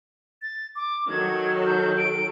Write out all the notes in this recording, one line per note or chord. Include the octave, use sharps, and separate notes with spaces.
A6
D6
D#3 F#3 A4 G#6
G6
D7